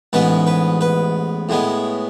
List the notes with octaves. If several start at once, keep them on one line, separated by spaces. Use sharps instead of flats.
A1 G#2 G#3 B3 B4
B4
B4
A2 G#3 B3